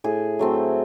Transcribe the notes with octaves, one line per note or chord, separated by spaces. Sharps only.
A2 G#4
F#3 A3 C4